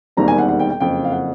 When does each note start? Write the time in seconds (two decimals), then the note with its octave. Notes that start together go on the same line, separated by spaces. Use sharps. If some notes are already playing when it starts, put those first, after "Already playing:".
0.17 E1 D#2 D#3 G3 C4 A#5
0.28 G#5
0.38 F#5
0.48 F#5
0.60 G5
0.70 G5
0.80 F#1 F2 C#3 G5
1.04 F5
1.12 F#5